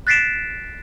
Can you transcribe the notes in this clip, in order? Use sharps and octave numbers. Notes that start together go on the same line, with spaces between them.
F#6 A6 B6 C7 D7 E7